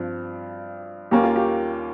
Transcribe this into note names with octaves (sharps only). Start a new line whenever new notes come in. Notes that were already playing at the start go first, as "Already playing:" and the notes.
Already playing: G2 F3 C4
D#2 D#3 A#3 C#4 G4
F4
G4